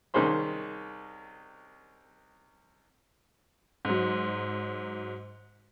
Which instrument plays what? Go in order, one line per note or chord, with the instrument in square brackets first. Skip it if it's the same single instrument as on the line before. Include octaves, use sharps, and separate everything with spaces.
[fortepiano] C2 D#3 C#4 G#4 C5 B5
[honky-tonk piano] G#2 F#3